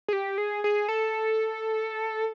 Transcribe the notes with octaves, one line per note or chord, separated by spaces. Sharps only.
G#4
G4
G#4
G#4
A4